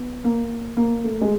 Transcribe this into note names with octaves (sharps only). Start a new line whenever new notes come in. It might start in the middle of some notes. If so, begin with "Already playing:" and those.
Already playing: B3
A#3
A#3
A3
G#3